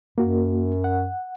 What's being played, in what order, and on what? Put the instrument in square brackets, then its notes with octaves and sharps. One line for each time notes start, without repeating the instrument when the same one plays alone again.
[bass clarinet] F#2 [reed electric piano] A#3 F#4
[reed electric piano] F#5